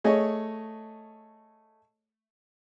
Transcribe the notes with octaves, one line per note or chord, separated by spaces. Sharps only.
A3 G#4 C#5 D#5